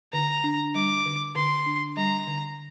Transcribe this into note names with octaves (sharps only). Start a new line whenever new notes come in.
D3 A#5
D4
G3 D6
D3
D3 C6
D4
G3 A#5
D3